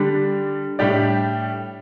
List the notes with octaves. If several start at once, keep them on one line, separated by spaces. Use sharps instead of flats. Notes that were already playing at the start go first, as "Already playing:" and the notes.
Already playing: D3 G3 D4
A2 G3 D4 G4 D5